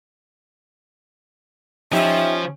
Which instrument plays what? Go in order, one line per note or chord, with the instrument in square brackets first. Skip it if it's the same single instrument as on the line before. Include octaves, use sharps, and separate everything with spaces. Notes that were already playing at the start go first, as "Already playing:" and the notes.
[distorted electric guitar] F3 [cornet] C#4 [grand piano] D#4 G4 [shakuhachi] E5